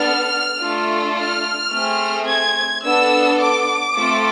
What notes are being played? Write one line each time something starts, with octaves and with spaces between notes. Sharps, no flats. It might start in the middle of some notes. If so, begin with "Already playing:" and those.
Already playing: B3 D4 A4 F6
A3 D4 F4 A4
F6
A3 C4 G#4
G#6
B3 D4 A4 E6
D6
A3 C4 F4 A4